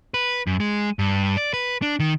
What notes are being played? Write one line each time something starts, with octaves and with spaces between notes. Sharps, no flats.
B4
F#2
G#3
G2
D5
B4
D4
D#3